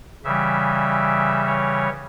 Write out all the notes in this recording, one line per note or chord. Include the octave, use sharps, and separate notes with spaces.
C#3 E3 G3 E5
C#5